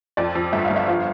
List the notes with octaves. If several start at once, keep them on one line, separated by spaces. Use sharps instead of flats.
F2 D5
F2
G1 E5
F5
G1
E5
F3 F5